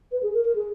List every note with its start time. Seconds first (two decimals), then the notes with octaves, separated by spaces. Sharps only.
0.12 B4
0.23 G#4
0.34 A#4
0.45 A#4
0.55 G#4